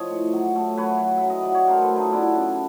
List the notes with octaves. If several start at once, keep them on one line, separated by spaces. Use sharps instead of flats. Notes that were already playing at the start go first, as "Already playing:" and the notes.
Already playing: F3 C#5 D#5
A2
F#3
A3
F#3 B4 C#5
F#3
E5
F#3
D#5
F#3 D5
C#5
A3 A#4 C5
A4 B4
A3
D#4 F4
B3 D4 E4
C#3